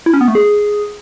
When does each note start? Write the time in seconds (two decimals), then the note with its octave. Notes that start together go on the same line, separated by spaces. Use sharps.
0.06 E4
0.13 C#4
0.21 B3
0.28 A3
0.35 G#4